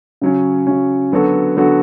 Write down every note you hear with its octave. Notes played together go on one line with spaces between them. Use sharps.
C#3 F#3 C#4
C#3 F#3 C#4
D3 F#3 B3 F#4 A4
D3 F#3 B3 F#4 A4